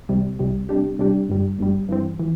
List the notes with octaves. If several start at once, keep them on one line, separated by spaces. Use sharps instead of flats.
C2 C3 G3
C2 C3 G3
C3 G3 D4 G4
C3 G3 D4 G4
G1 G2 G3
G1 G2 G3
G2 E3 C4
E3